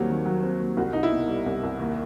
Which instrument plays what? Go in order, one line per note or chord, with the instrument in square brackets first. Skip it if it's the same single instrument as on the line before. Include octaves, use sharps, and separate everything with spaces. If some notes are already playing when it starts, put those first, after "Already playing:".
Already playing: [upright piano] D#2 C4 [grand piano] F#3 G3
[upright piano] D#3
F#3
C4
D#2
[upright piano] C2 [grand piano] F#4
[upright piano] C2 [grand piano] D#4
[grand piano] E4
[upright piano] B2
G3
C2
C2
D#2